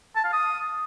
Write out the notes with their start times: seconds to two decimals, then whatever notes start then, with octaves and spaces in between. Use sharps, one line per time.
0.16 A5
0.24 F5
0.33 D#6